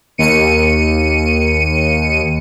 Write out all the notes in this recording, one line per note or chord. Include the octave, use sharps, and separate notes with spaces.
D#2 C#7 D#7